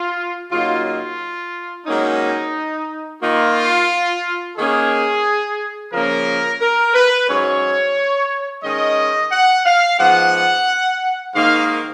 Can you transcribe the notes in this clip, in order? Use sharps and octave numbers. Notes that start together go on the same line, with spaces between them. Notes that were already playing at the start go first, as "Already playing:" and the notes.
Already playing: F4
C#3 F#3 A#3 D#4 F4
F4
G#2 F#3 A#3 C#4 D#4
D#3 A#3 D#4 F4
D#3 A#3 C#4 G#4
C#3 F3 A#3 C#4 A#4
A#4
B4
G#2 F#3 C#4 C#5
D#3 G#3 C#4 D#5
F#5
F5
G#2 F3 B3 F#5
G#2 D#3 A#3 D#4 F5